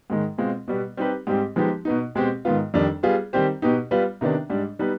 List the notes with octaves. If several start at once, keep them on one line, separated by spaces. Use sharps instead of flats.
G#2 D#3 G#3
B2 G#3 C4 F4
B2 G3 B3
G3 C4 D#4 G4 B4
G#2 G3 C4 G4
F3 G#3 B3 D#4 G4
B2 B3 D#4
B2 G#3 C4 G4
G#2 D#3 B3 F4
F2 D#3 G3 D4
G3 B3 F4 G#4
D#3 G3 C4 G4 C5
B2 B3 D#4 G4
G3 B3 F4 B4
C3 D#3 B3 D4
G#2 G3 D4
G3 B3 D#4 B4